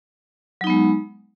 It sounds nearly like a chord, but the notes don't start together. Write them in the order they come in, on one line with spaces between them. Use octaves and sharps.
F#3 D#4 B3 G#3